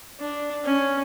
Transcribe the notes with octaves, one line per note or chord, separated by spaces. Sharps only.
D4
C#4